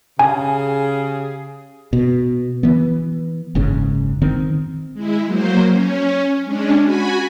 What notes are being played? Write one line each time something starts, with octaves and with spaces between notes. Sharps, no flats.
C#3 G4 G#4 G#5
B2
E3 B3
F#1 G#2 C#3
D#3 C4
G#3 E4
F#3 A#3 C5
C#4
G#3 C#4 D4
F#4 G#5 B5